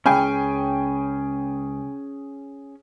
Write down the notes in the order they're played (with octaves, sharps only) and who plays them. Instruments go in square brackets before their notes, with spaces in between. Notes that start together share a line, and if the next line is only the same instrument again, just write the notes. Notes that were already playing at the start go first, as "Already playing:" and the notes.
[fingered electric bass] C#3 G#3 [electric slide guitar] C#4 G#4 [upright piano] G5 G#5 B5